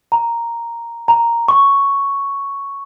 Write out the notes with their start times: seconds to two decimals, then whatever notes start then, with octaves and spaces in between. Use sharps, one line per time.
0.12 A#5
1.08 A#5
1.48 C#6